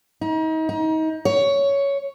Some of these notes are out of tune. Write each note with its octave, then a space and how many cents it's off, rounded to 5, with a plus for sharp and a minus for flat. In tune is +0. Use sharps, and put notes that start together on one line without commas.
D#4 +35
D#4 +30
C#5 +10